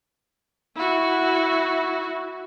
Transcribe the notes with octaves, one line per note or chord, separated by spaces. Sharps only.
E4 F#4